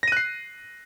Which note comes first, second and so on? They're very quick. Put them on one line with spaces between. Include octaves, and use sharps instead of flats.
A#6 D#7 F#6 C7